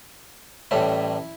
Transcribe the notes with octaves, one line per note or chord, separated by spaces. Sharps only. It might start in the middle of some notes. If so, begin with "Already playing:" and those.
A1 A2 G3 E4